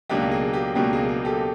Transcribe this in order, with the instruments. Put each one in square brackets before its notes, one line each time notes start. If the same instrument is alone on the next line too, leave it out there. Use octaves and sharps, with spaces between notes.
[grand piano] C#2 B2 F#3 A#3 D4 G4
G#4
G4
C#2 B2 F#3 A#3 D4 G4
G#4
G#4
G4 A4